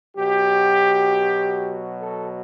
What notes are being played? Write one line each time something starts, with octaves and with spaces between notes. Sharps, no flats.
B2 F#3 G4
A4